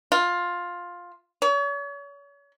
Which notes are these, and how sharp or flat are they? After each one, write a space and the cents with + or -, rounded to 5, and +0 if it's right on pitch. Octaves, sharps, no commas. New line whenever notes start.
F4 +10
C#5 +40